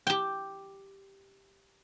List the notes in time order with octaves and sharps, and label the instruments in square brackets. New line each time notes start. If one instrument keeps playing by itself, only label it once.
[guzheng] G4 G5